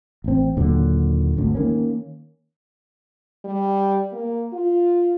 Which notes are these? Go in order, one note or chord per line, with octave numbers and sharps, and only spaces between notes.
A1 C4
D#2 A#2 D3 F#3
G#1 D2
D#3 A#3 C#4
G3
A#3
F4